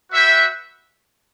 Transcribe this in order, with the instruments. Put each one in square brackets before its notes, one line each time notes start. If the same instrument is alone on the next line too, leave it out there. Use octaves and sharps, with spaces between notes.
[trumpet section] F#4 B4 E5 G5